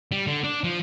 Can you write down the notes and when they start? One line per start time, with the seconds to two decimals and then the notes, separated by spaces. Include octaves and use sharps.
0.12 G3
0.27 D3
0.44 D4
0.64 F3